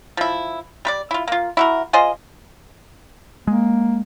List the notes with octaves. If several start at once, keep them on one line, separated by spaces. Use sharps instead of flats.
F3 E4
G3 B4 D5
E4 F4
A#3 F4
E4 F#4 A#4
F4 G#4 C5 D#5
G#3 A#3